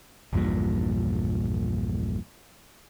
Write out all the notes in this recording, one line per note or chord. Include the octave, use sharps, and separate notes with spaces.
A#1 E2 G2 A#2